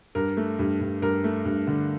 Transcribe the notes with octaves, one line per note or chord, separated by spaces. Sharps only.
G2 A#4
A3
G2
G2
G2 A#4
A3
G2
D3